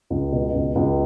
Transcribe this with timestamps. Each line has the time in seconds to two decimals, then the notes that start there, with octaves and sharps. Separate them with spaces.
0.10 C#2
0.32 B2
0.54 C#2
0.75 C#2